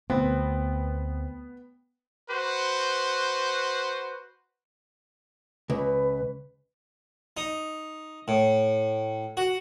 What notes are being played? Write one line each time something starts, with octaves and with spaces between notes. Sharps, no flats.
D2 B3 C4
F#4 B4 C5
C#2 B4
D#4
A2
F#4